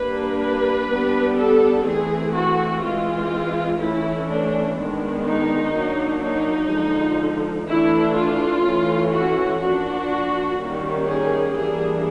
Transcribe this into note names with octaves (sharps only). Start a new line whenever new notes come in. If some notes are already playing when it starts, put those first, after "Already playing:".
Already playing: G3 A#3 D4 B4
B4
G3 B3 D4
A4
E3 A3 C4 G#4
F#4
E3 G#3 C4 F4
E3 A3 C#4 E4
D4
D#3 G#3 B3 D4
D#4
F#3 A#3 D4
D#4
D3 F3 G#3
E3 A3 D4 E4
F4
E3 A3 C#4
F#4
F3 A#3 D4 F#4
D#3 G3 A#3 C#4
G#4
E3 G3 A#3 D4 G#4